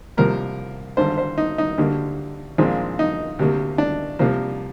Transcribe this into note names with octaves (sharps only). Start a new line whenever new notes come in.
C2 C3 F3 A#3 A#4
G#1 G2 D3 C5
C5
D#4
D#4
D2 D3 G3 A#3
A#1 A#2 G#3 C4
D#4
D2 C3 G3 A#3
D4
C2 C3 F3 A#3